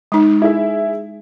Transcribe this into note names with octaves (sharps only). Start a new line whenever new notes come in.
G#3 D#4
E4 G#4 E5